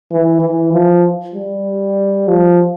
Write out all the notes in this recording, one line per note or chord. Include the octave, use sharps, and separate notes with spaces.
E3
E3
F3
G3
F3